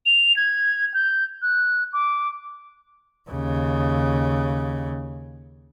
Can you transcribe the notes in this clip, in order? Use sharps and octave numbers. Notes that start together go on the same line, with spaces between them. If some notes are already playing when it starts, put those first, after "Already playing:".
F7
G#6
G6
F#6
D6
D#2 C#3